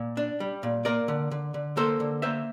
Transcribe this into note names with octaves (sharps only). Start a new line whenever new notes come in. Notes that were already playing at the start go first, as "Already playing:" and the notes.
Already playing: A#2
D4
G3
A#2
A#3 A#4 D5
D3
D3
D3
A#3 A4 C5
D3
A#3 C5 E5